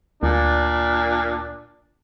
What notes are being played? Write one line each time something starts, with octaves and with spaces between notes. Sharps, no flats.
D2 A#2 D4